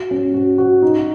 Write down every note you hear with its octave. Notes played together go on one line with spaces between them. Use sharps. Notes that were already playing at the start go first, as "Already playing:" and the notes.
Already playing: F#4
C#4
F#4
F#4
D#4